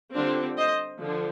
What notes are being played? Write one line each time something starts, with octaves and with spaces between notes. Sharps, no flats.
D3 G3 C4 D4 F4
C5 D#5
D3 F3